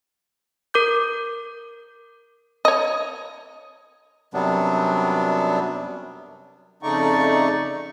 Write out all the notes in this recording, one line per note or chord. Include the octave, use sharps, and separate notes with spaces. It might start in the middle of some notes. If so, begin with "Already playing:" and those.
A#4 D6 G6
C#5 D#5
F#2 C3 F#3 G3 B3 D4
F2 C#3 A3 D#4 D5 C#6